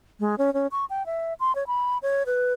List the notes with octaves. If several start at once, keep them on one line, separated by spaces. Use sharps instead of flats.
G#3
C#4
C#4
C#6
G5
E5
C6
C#5
B5
C#5
B4